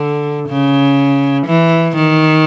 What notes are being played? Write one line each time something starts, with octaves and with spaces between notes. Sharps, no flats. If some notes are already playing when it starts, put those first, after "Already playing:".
Already playing: D3
C#3
E3
D#3